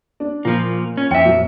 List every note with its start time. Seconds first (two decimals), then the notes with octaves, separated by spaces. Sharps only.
0.20 D4
0.45 A#2 F3 A#3
0.97 C#4
1.11 F2 E5 G5 C#7
1.25 A#2 F#3